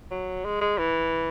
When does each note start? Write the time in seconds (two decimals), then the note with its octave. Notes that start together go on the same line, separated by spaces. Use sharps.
0.11 F#3
0.45 G#3
0.61 G#3
0.79 E3